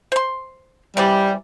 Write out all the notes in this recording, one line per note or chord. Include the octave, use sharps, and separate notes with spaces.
C5 C6
C3 E3 G3 D5